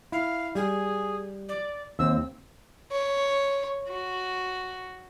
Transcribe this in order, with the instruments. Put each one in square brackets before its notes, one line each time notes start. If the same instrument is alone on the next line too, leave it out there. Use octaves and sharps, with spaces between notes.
[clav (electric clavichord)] E4 [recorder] F5
[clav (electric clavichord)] G3 [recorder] G#4
[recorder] D5
[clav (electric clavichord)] D#2 C4 [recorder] E6
[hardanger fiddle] C#5
F#4